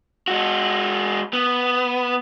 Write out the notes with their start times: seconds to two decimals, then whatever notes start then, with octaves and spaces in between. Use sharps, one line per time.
0.28 G#3 F#4
1.33 B3